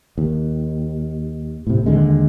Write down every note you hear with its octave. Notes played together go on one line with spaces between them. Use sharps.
D#2
A2 C3
D#2 D3 G#3